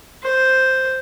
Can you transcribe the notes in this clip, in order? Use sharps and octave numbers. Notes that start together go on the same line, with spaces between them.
C5